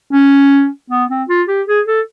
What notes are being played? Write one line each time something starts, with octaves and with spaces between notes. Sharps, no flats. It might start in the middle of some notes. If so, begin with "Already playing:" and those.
C#4
B3
C4
F4
G4
G#4
A4